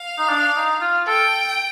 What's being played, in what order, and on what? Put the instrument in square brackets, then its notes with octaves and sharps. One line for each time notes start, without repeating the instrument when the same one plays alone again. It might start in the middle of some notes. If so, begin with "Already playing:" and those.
Already playing: [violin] F5
[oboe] D#4
D4
D#4
F4
[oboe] A4 [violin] G5